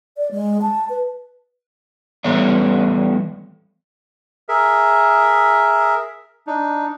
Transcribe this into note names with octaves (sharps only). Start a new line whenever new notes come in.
D5
G#3
A5
B4
E3 G3 A3 B3 C#5 E5
G#4 A#4 E5
D4 D#4